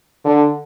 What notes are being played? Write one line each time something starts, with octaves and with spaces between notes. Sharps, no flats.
D3